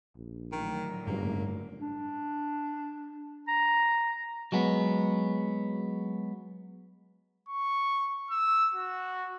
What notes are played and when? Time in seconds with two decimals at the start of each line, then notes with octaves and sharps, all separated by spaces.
0.16 A#1
0.52 A2 D3 D#3 F#3
1.07 F#1 G2 A#3
1.81 D4
3.48 A#5
4.52 F#3 G#3 B3
7.49 C#6
8.31 E6
8.74 F#4